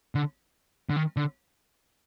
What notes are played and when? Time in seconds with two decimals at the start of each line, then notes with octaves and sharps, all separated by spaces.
0.15 D3
0.90 D3
0.96 D#3
1.17 D3